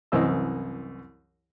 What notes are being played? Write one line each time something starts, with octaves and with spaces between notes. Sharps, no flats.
C2 F#2 E3 C5 D#5 E6